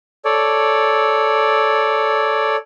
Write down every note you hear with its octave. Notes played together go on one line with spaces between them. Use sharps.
A4 C#5 D5